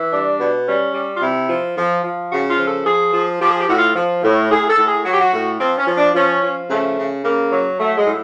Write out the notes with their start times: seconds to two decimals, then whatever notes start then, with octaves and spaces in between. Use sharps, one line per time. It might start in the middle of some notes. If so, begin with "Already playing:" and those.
Already playing: E3
0.12 G3 D4
0.40 B2
0.67 G3 C#4
0.94 G3
1.17 F4
1.22 C3 E4
1.49 F3
1.77 F3
2.04 F3
2.32 C#3 F#4
2.50 F4
2.58 F3
2.68 A4
2.86 F3 G#4
3.13 F3
3.41 F3 G4
3.51 G#4
3.60 G4
3.68 A2 F#4
3.78 F4
3.95 F3
4.23 A2
4.51 A2 G#4
4.69 A4
4.78 A2
4.87 G#4
5.05 F#3 F#4
5.13 G4
5.20 F#4
5.33 A2
5.60 F3 C4
5.78 C#4
5.87 F3
5.97 D4
6.14 F3 C#4
6.43 F3
6.70 C#3 A3
6.98 C#3
7.24 C#3 A#3
7.52 F#3
7.79 F#3 A3
7.98 G#3
8.06 A2